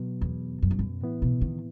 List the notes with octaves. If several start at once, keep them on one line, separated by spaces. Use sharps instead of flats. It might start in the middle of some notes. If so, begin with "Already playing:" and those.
Already playing: B2 F#3 B3
E2
F#2
G2
F#2
A2 E3 B3 E4
B2
D#3